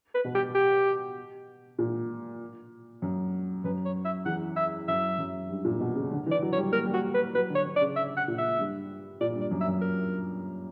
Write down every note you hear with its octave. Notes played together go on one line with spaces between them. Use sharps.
B4
B2
G4
G4
A#2
F#2
F#2 B4
C#5
E5
E2 F#5
E5
F#2 E5
F#2
G2
A#2
B2
C#3
D3
E3
D5
F#3
C#5
G3
A#3 A#4
G3
F#4
B4
F#3 B4
D3
C#5
D3
D5
C#3
E5
F#5
A#2
E5
G2
A#2 D5
G2
D5
F#2
E5
F#2
A#4